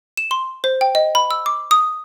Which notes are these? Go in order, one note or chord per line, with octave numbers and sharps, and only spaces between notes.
E7
C6
C5
G5
D#5
B5
E6
D6
D#6